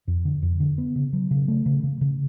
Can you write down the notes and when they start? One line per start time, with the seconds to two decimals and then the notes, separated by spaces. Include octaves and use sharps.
0.08 F2
0.25 D3
0.43 F2
0.60 D3
0.78 B3
0.96 C#3
1.13 F#3
1.31 C#3
1.48 A3
1.66 C#3
1.83 C#3
2.01 C#3